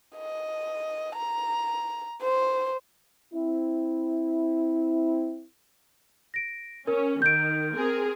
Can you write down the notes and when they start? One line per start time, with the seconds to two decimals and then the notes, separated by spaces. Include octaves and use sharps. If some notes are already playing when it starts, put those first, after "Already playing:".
0.16 D#5
1.16 A#5
2.22 C5
3.34 C4 E4
6.34 A#6 D7
6.87 C#4 A#4
7.22 D#3 G6 D7
7.73 C4 G#4 A#4